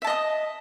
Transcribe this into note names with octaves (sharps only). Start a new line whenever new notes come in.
D#5 E5 A5 D#6